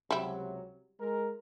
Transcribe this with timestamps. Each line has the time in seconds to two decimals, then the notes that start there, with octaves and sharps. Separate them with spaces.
0.11 C#2 C3 F#3 G3 E4
0.99 G#3 A#4